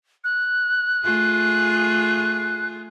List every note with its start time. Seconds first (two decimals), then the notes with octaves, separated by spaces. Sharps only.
0.24 F#6
1.04 A3 F4 G#4